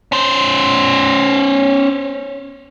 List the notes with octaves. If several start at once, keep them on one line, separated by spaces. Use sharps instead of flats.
C#4 C5